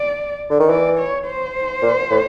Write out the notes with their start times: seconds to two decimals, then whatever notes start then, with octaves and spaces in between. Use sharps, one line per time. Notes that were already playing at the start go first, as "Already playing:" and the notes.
Already playing: D5
0.50 D3
0.60 D#3
0.69 E3 D5
0.98 C#5
1.26 C5
1.82 A#2
2.10 A2